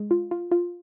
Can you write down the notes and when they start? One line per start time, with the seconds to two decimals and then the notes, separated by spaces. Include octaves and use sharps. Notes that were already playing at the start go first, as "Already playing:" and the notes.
Already playing: G#3
0.11 F4
0.31 F4
0.52 F4